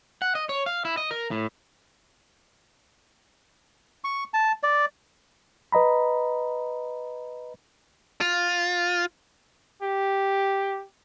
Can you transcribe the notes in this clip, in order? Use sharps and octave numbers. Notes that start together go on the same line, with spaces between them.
F#5
D#5
C#5
F5
E4
D#5
A#4
A2
C#6
A5
D5
B4 D#5 A#5 B5
F4
G4